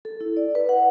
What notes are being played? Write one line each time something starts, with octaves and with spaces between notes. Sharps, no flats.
A4
E4
D5
B4
F#5